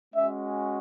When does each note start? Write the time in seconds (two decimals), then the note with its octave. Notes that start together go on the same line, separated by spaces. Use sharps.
0.15 G#3 C#4 F#4 E5